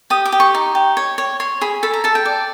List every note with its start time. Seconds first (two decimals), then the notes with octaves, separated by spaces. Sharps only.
0.10 G4 D#6
0.26 D6
0.32 G4
0.40 C#6
0.55 D#4
0.75 G4
0.97 C#5
1.18 C#5
1.40 C#5 C6
1.61 G#4 B5
1.83 A4 B5
1.94 A#5
2.04 A4 A5
2.15 G5
2.25 D5